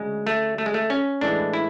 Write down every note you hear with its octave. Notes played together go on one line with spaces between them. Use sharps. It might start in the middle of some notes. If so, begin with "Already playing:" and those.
Already playing: D2 C#3 G#3
A3
A3
G#3
A3
C#4
A2 E3 G#3 D4
E4